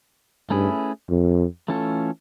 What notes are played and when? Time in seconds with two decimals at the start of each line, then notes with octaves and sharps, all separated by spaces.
0.50 G2 A3 C#4 E4 G#4 B4
1.10 F2
1.68 E3 A3 C#4 F4 A4